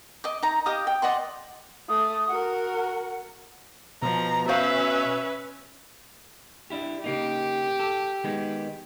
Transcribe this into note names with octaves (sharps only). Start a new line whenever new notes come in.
D#5 D6
D#4 A#5
G4 D#5 F5 D#6
G5
D5 D#5 F#5 C6
A3 D#6
F#4 A#4 F#5
B2 F3 A#5
C#4 F#4 B4 C5 E5 F5
D4 E4 G4
C#3 A#3 D#4 G4
A4
D#3 G#3 B3